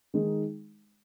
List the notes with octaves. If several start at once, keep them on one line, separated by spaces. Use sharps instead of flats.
D#3 G#3 D#4 G#4